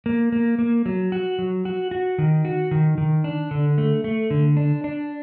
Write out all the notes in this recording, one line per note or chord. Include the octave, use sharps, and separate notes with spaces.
A#3
A#3
A#3
F#3
F#4
F#3
F#4
F#4
D#3
F#4
D#3
D#3
D4
D3
A3
A3
D3
D4
D4